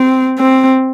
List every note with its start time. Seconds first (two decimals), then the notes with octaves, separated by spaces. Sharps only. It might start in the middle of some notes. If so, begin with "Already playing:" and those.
Already playing: C4
0.39 C4